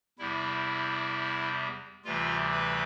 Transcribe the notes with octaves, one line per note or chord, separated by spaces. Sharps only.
E2 C3 G3 E4
D2 C3 E3 G3 F4
B4